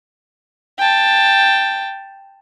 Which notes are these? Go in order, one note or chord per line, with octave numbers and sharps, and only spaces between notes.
G5 A5